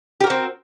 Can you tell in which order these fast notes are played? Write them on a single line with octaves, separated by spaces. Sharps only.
G4 A#4 F#4 C4